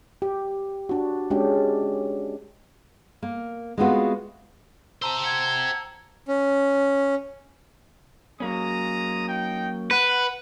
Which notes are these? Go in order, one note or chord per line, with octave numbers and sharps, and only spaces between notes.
G4
D4 F#4
G#3 C#4 D4 G4
A#3
G#3 A3 B3 C4 F4 F#4
G4 C5 A5 A#5 E6
F#5 G#6 C#7
C#4
F#3 G#3 A#3 C#4 A#5 D#6
D#4 G5
B4 F#5